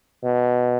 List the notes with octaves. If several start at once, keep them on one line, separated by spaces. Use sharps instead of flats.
B2